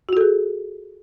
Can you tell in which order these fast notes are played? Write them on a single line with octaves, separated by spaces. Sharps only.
F#4 F4 A4 G#4